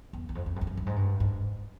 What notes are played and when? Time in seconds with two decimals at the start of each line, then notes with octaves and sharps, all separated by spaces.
0.13 E2
0.29 E2
0.35 F2
0.46 F2
0.56 F#2
0.61 F2
0.67 F#2
0.77 G2
0.86 G#2
0.96 G2
1.20 G#2